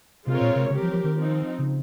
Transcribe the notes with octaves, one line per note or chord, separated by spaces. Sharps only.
C3 G#3 C4 F4 A#4 C#5
A#2
C3
C#3 C4 G4 A#4
F3
F3
D#3
F3 C4 D#4
C#3